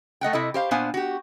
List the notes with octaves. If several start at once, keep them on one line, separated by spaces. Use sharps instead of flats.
A3 D#5 F#5 G5
C3 E4 A4 D#5
G4 C5 F5
A#2 B3 D4 C5 F5 G#5
F#4 G4